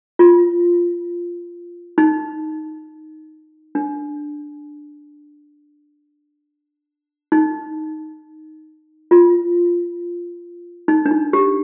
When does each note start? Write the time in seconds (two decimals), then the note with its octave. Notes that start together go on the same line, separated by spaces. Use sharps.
0.19 F4
1.98 D#4
3.75 D4
7.32 D#4
9.11 F4
10.88 D#4
11.06 D4
11.11 D#4
11.33 G4